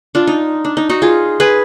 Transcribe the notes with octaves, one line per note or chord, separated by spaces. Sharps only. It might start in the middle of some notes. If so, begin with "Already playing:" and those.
D4 F4
D#4
D4
D#4
D#4 F#4
F4 G#4
G#4 B4